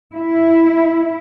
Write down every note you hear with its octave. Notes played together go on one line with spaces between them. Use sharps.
E4